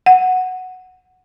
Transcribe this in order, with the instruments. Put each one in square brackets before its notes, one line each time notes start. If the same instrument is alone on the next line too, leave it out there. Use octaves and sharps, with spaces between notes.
[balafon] F#5